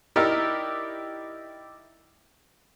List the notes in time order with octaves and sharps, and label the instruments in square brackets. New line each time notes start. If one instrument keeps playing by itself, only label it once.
[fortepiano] D#4 E4 G4 A#4 D5